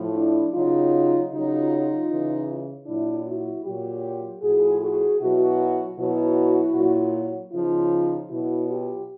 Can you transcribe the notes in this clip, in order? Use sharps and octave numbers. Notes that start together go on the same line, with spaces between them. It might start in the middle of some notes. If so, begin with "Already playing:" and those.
Already playing: A2 F3
D4 E4
C#3 F#3 D#4 F4
C#3 F#3 D#4 F4
C#3 E3
A#2 F#3 D4 E4
E4 F#4
A#2 F#3 F4 G4
A2 F3 F#4 G#4
F#4 G#4
B2 F#3 E4 F#4
B2 F#3 E4 F#4
A#2 F#3
C#3 F3 D#4 F4
B2 F#3 E4 F#4
F4 G4